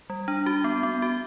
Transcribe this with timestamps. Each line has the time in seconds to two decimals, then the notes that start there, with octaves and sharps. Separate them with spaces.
0.10 G3
0.28 D4
0.46 F#4
0.64 B3
0.83 B3
1.02 F#4